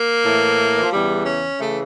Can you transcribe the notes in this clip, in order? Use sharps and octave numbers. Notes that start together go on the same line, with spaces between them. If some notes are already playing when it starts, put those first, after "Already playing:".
Already playing: A#3
A2 E3
E3
F3
E2 C#3 E3 G3
C#4
C#3 E3 A3